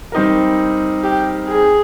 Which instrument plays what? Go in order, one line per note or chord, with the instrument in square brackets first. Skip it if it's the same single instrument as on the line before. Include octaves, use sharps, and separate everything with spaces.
[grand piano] G3 C4 D#4 A#4
[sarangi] G4
G#4